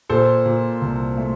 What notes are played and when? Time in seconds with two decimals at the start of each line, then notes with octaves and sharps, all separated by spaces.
0.09 A#2 A4 C5
0.46 A#2
0.82 C2
1.18 A3